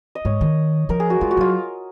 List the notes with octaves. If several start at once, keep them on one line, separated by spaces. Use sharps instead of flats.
D#5
G#2 C#5
D#3
F3 A#4
G#4
F#4
G#3 F4
F#4
F#3 F4